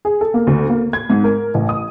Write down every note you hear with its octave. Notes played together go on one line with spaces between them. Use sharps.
G#4
A4
A#3
D2
A#3
G#6
G#2
A#4
A1
D#6